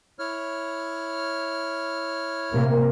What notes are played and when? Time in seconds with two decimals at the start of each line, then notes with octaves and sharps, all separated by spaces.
0.19 E4 C#5 F6
2.52 C3 A#3